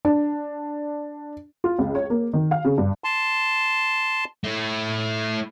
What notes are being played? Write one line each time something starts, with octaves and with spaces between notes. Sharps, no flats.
D4
F4
C#2
C#5
A#3
D#3
F5
C#3
G2
A5 C6
A3 E4